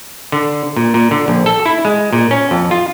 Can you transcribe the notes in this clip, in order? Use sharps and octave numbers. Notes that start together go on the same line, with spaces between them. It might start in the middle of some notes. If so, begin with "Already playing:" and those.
D3
A#2
A#2
D3
A#1
A4
E4
G#3
A#2
C#4
F2
F4